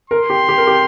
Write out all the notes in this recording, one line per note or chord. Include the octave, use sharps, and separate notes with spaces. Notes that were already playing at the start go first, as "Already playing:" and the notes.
A#4 C6
G4
G4
A#4
G4